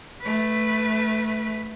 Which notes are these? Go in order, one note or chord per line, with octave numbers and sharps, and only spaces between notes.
A3 B4